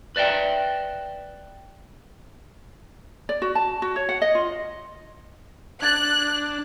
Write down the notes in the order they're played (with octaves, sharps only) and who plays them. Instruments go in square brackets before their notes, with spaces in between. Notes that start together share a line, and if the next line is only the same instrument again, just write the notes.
[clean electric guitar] B4 D5 E5 G5
[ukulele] D5
F#4
A5
F#4
C#5
F#5
D#5
F4
[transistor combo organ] D4 [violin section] F#6 [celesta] G#6 A6